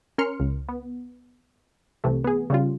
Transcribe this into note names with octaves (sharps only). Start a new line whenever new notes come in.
C#4 A#4 C6 F6 C#7
C#2
B3
C2 C3 E3 A3
B3 G#4
C#3 G3 F4